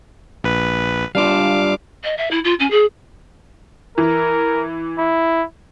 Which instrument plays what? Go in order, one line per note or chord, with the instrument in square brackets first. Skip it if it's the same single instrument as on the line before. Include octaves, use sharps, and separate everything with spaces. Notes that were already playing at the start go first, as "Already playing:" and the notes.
[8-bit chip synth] A#1 B4
[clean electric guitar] G3 D4 F4 [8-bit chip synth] F5 D6
[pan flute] D#5
E5
E4
F4
C#4
G#4
[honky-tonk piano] E3 [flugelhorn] A#4
[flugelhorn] E4